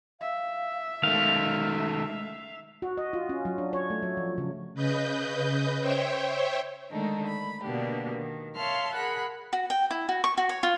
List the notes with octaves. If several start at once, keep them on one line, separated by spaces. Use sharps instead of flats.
E5 F5
D#3 G#3 A3 F5
F#4
D#5
F4
C#4
F#3
D4
C#5
A3
F#3
F3
C#3
C#3 B4 D#5 G6
C5 C#5 E5 G5
D3 D#3 G#3 A3 D4 D#4
B5
B2 D3 A#3 B3 D4 G4
D#3
C#5 E5 F5 A5 C6 F6
G#4 A#4 F#5 B5 F#6
F#4
G5
E4
F#4
C#6
F#4
C#5
F4